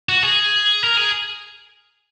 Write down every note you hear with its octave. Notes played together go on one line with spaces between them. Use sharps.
F#4
G#4
A#4
G#4